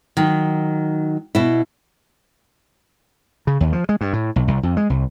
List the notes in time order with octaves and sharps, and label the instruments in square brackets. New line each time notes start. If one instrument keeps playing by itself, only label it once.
[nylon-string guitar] D#3 F#3
B2 E4
[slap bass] C#3
D#2
F3
G#3
G2
A2
B1
C2
F2
G#3
C2